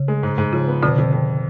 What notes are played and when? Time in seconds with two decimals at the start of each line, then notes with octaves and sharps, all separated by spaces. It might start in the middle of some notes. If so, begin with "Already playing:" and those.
Already playing: C#3
0.08 G#3
0.23 G#2
0.38 G#2
0.53 C#3 F3
0.68 B3
0.83 F2 B2 D3
0.98 F2
1.13 F2